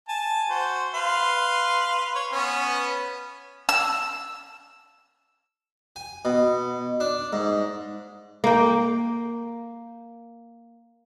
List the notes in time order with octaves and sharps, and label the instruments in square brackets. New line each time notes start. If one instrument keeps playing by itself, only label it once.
[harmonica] G#5 A5
F#4 C5
B4 F5 C6
C#5
B3 C#4
[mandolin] E6
[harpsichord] G#5
B2
D4
G#2
[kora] A#3 G5